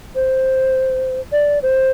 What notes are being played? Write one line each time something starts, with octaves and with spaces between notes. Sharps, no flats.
C5
D5
C5